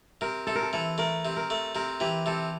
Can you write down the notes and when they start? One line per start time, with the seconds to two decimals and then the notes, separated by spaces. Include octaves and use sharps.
0.21 C3 A#4
0.47 C3 A4
0.55 A#4
0.63 A4
0.73 E3 A4
0.98 A3 A#4
1.25 C3
1.37 A#4
1.50 A3
1.75 C3 A#4
2.00 E3 G4
2.26 C3 A4